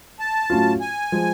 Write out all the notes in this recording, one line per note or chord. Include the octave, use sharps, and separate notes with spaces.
A5
A2 F#3 C#4 F4
G#5
F3 G#3